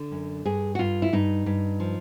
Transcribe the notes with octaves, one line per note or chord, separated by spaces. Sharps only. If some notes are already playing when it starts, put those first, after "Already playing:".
Already playing: D3
F#2
G2 G#4
F#4
G2 F4
E4
G2 D#4
G2
F3